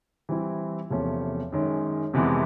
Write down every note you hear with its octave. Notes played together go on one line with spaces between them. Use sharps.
E3 G3 C4 E4
E2 C3 F3 A3 C#4
F#2 D#3 G#3 C#4
F2 C3 E3 G#3 B3